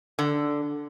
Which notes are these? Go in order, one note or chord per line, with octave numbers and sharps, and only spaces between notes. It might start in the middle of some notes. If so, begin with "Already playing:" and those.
D3